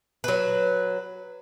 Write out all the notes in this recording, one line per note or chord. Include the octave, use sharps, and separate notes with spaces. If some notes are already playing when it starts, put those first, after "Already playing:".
F#3 B4